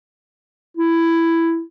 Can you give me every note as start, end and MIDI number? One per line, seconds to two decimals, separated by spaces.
0.77 1.62 64